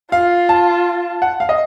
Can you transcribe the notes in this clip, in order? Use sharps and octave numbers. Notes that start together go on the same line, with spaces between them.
F4 F5
A5
F#5
F5
D#5